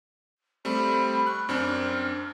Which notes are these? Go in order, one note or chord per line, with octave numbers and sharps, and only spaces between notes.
G3 A3 C4 B5
C#6 F#6
F#2 C4 D4 F6